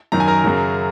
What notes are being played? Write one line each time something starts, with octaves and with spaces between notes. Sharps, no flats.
F#2 D#3 F#3 A#5
G#5
A#4 A#5
F#2 C#3 F#3